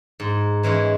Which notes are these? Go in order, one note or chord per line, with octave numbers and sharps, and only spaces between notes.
G#2
E3 G#3 C#4 E4